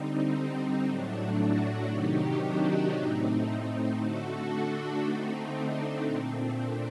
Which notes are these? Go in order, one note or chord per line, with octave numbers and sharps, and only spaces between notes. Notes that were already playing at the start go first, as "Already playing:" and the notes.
Already playing: D3 G3 C4 D#4
C4
A2 F#3 A3 D4
D4 F#4
C3 D#3 F#3 D#4 G4
D4 F#4
A2 A3 C4 D#4
D3 A3 F#4 A4
D4 F#4
D3 A3 C4 D#4
D4
A#2 A3 C4
D4